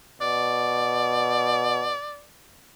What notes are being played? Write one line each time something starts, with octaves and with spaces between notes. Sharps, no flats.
B2 D5